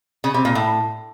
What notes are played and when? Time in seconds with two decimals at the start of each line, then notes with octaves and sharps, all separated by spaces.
0.24 C#3
0.34 C3
0.45 A#2
0.55 A2